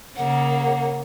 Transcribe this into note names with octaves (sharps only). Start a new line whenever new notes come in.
C#3 A#3 F#5